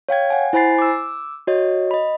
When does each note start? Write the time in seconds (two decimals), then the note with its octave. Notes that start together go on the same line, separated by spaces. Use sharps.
0.09 C#5 F5 G5 G#6
0.30 F#5 G#5
0.53 E4 C5 G#5 B5 A6 C7
0.79 D6 E6
1.47 F#4 C#5 D#5
1.91 D#5 B5